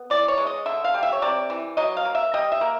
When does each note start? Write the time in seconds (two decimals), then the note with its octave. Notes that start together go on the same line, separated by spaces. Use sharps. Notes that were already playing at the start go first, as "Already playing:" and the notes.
Already playing: B3
0.10 E3 D5
0.28 C#5
0.38 G#3
0.47 D#5
0.66 D3 E5
0.84 F5
0.94 G3
1.03 E5
1.12 C#5
1.22 C3 D5
1.50 E3
1.77 F#3 D#5
1.97 F5
2.05 A#3
2.15 E5
2.34 G3 D#5
2.52 E5
2.61 A#3